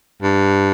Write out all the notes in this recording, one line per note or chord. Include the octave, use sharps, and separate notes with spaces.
G2